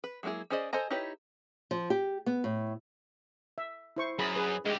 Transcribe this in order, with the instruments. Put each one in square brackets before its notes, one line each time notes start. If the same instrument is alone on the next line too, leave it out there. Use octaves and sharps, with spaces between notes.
[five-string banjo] B4
F#3 G#3 A#3 E4 G#4
C#4 G#4 C5 D5 D#5
A4 C5 D#5 G#5 A#5
D#4 E4 G4 B4 C#5
[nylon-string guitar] F3
G4
B3
A2
[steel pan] E5
E4 C5 C#6
[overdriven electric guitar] F#2 [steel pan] G#4 B5
[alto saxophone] G#4 [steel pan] B4
[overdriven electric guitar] D2 G4 [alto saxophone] G#3